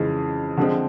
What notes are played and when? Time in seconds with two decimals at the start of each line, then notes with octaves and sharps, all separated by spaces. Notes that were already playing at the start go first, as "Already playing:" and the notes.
Already playing: F2 C#3 E3 G#3
0.57 D3 F3 G#3 C4